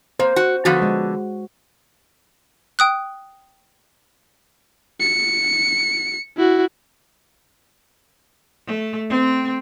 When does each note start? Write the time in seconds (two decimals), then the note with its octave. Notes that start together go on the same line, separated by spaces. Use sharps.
0.20 A#3 C5
0.36 F#4
0.65 D3 F3 B3 F#4
0.82 G#3
2.79 G5 D#6 F#6
5.00 C#7
6.37 E4 F#4
8.66 A3
9.09 C4